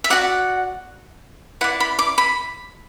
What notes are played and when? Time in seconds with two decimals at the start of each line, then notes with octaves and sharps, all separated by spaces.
0.04 E5
0.10 F#4 D5 F#5
1.61 E4 F#5
1.64 D5
1.80 B5
1.99 D6
2.18 B5